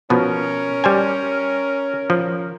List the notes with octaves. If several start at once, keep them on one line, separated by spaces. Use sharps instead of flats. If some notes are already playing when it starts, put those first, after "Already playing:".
B2 F3 B3 C#4 A#4
G3 C5 G#5
F3